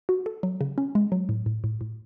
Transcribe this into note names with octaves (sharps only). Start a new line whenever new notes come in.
F#4
A4
F#3
C#3
C#4
G#3
F#3
A2
A2
A2
A2